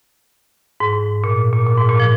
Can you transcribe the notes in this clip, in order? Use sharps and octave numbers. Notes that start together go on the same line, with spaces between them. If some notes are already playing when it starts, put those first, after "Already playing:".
G#2
A#2
A#2
A#2
G#2
A#2
F3